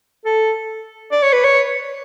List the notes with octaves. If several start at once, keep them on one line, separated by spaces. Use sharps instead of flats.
A4
D5
C#5
B4
C#5